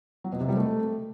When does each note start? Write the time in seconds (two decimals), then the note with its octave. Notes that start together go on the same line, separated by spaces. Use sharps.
0.24 F#3
0.32 B2
0.41 C3
0.49 G3
0.57 A3